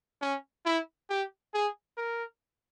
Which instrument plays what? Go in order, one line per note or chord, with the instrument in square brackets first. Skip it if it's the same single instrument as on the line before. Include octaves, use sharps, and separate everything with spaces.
[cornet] C#4
E4
G4
G#4
A#4